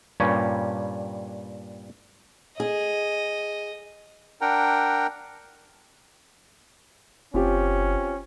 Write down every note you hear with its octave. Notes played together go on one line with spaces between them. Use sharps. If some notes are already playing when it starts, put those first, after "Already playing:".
G2 A#2 G3 C#4
G#4 D#5
D4 A#4 F#5 G5 A#5
F#1 C4 C#4 F4 G4